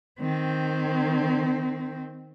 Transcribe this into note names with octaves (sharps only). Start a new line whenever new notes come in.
D#3 C4